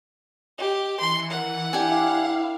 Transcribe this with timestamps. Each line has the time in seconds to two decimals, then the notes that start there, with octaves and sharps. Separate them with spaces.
0.59 G4 D#5
1.00 E3 C6 C#7
1.31 A#4 F#5
1.73 D4 E4 G4 D5 F5 G5 G#5